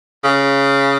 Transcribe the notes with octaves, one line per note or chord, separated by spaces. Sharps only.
C#3